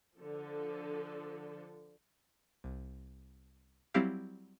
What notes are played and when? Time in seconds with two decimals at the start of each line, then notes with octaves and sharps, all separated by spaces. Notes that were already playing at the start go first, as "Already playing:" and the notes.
0.18 D3 F3 A4
2.64 C2
3.94 F#3 G3 C4 E4 G4 F5